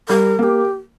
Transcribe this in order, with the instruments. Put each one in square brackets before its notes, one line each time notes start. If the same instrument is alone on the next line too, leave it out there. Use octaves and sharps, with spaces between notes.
[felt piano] G3 [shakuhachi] A#4
[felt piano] A#3 [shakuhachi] A#4
[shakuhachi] G4